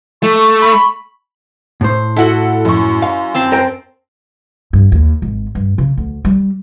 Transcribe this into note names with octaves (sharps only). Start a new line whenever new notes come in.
A3 C#6
B5
A2 C5
E4 F#4 A4 F#5 F#7
F#2 C#6
F5
C4 A5 C6
A#4 C5 G5
G2
D#2
G#1
G2
C#3
D2
G3